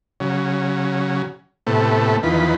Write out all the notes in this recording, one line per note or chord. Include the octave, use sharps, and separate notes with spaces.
C#3 F#3
A2 C3 A3 B3
E2 D#3 F3 B4